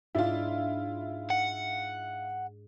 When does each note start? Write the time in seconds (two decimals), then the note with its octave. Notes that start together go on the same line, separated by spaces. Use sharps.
0.15 G#2 D4 E4 F4
1.30 F#5